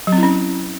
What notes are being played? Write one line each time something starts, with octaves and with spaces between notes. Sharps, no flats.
F#3
C4
E4
C#4